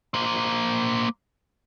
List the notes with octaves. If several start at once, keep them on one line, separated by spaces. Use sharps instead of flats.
A#3 C5